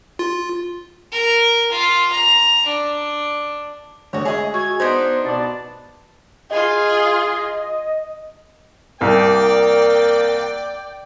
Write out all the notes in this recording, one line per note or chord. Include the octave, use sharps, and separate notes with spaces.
F4
A#4
F4
A#5
D4
D2 D3 F#4 C#5
G#3 G#4 C#5 D#5 E5
F#4 C#6 G#6
B3 D4 D#4 C5
B2 D5 A5
F4 G#4 D#5
C2 A#3 D5 G5